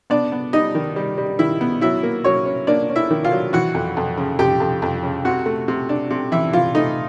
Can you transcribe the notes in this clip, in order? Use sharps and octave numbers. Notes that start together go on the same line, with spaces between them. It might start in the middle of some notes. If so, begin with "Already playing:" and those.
B3 D4 D5
B3
G3 D#4 D#5
D#3
G3
G3
D#3 E4 E5
B3
F#3 E4 E5
A#3
F#3 C#4 C#5
C#4
A#3 D4 D5
C#4
E4 E5
D#3
F4 F5
F#3
E3 F#4 F#5
F2
F2
C#3
F2 G4 G5
F2
F2
C#3
C3 F#4 F#5
A3
C3
D4
C3
E3 E4 E5
E3 F4 F5
A3 D#4 D#5